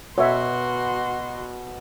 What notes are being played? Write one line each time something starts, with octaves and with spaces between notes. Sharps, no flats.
B2 F#4 C#5 E5 C6